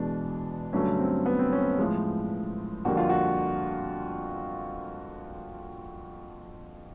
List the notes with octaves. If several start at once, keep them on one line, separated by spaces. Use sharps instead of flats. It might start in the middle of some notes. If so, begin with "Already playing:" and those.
Already playing: E2 B2 G#3 D4
G2 D3 F#3 A3 C#4
C4
B3
C4
C#4
A2 F3 G#3
F2 D3 G3 A#3 F#4
F4
F#4